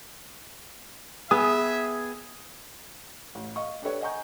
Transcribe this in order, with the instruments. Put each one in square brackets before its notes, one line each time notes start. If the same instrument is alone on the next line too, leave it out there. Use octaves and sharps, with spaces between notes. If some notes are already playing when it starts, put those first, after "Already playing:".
[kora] B3 [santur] G#4 [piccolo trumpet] E5 [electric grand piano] D#6
[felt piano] A1
D#5 F5 C#6
D4 G4 A4 B4 C#5
D#5 F#5 G#5 A#5 C#6 G6